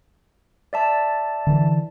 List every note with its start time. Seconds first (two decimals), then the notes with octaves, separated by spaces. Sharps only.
0.73 D5 E5 A5
1.47 D3 E3